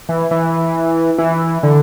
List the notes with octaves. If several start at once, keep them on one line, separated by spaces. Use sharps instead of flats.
E3
E3
E3
D3